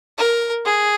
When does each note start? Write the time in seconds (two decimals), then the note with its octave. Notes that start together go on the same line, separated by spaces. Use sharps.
0.18 A#4
0.65 G#4